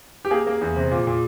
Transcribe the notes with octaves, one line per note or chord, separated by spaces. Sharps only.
G4
A#3 G#4
A#3
E2
C3
A#2
A#2